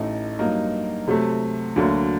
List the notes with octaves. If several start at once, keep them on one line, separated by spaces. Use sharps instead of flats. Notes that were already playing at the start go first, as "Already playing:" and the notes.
Already playing: A1 A2 A3 D#4
G2 F#3 A#3 D#4
C3 F#3 A3
D2 D3 F#3 A#3